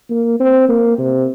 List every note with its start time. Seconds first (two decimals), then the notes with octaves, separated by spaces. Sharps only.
0.10 A#3
0.40 C4
0.69 A#3
0.98 C3